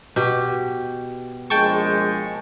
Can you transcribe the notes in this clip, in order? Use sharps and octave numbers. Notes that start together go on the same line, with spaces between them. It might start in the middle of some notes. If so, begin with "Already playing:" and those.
B2 G4
A#1 G#3 G5 A5 C#6